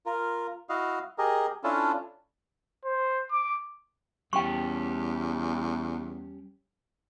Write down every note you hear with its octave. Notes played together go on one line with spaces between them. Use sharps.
F4 A#4
E4 F#4 D#5 F5
G4 G#4 A#4 D#5
C#4 D4 E4 F4 A4
C5
D6
E2 G3 C#4 G4 G5 C#6